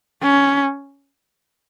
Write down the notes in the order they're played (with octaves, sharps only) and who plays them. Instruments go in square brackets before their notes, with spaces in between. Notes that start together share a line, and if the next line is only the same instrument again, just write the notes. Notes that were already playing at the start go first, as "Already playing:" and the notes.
[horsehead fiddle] C#4